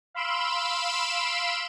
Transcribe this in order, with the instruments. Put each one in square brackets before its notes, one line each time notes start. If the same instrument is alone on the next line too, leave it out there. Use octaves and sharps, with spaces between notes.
[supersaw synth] F5 B5 C6 E6 D7 E7